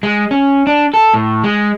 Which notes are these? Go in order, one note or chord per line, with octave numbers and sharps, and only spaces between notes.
G#3
C#4
D4
A4
A2
G#3